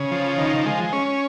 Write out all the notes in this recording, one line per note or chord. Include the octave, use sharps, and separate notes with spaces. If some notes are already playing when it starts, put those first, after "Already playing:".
Already playing: C#3
F3
D#3
G#3
C#4